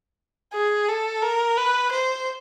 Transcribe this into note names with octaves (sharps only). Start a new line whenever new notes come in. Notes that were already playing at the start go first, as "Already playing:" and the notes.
G#4
A4
A#4
B4
C5